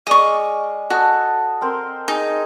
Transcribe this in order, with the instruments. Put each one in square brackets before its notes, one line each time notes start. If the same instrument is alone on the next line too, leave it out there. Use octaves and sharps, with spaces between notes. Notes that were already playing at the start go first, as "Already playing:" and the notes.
[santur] G#3 D5 F5 [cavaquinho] D#5 C#6
[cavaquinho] F#4 [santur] A4 D#5
[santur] C4 A#4 C6
[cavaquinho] D#4 [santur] G#4